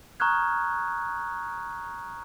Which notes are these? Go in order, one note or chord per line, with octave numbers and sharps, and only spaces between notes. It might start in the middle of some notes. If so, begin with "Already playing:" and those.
A#5 C#6 D#6 F6 F#6 G#6